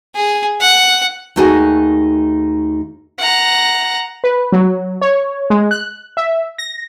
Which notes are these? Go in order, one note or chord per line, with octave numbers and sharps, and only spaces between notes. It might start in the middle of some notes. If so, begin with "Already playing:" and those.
G#4
F#5
D#2 A3 D#4 F#4 G#4 G#5
F#5 A#5
B4
F#3
C#5
G#3
F#6
E5
A#6